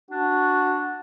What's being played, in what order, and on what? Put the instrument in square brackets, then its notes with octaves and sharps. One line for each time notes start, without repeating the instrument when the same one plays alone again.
[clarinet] D4 [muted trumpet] F#4